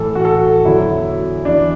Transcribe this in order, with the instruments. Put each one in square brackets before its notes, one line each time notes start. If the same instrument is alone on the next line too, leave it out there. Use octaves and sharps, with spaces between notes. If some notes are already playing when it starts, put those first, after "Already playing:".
Already playing: [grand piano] A2 E3 A4
F#4
A4
E2 D3 F#3 E4
E2 E3 D4